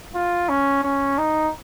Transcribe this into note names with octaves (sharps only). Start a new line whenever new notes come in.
F4
C#4
C#4
D#4